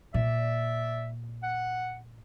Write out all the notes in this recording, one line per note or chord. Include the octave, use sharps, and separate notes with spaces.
A#2 D5 E5
F#5